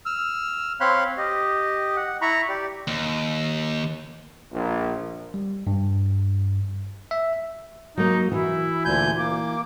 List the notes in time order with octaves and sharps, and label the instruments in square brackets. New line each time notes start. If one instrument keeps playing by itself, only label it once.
[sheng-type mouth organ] E6 F6
C4 C#5 F5 B5 C6 F#6
G4 D#5
F#5
E4 A#5 B5 C#6
G4 D5
[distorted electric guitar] D#2
[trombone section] A#1
[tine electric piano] G3
G2
E5
[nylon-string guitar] F#3 A#3 [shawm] D#4
[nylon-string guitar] E3 F#4 [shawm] E4
[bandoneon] D2 A#2 G6 [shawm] G#5
[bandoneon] A#3 [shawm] D6